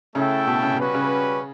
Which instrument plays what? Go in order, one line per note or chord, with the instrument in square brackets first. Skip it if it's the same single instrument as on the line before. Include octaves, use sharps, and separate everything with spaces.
[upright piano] C#3 [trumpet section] A3 E4 A4 E5 G5
[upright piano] B2
C#3
B2
[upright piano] C#3 [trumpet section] G3 C#4 F#4 B4
[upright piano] C#3